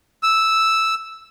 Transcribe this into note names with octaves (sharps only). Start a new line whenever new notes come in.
E6